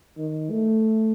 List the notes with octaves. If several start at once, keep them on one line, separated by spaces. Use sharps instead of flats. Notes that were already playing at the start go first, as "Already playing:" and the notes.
D#3
A3